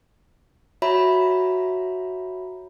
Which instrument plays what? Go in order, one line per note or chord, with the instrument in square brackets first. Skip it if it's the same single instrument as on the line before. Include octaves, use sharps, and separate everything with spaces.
[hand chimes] F#4 C#5 E5 A#5 B5